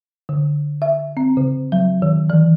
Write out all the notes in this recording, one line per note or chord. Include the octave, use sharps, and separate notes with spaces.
D3
E5
C4
C#3
F#3
D#3
E3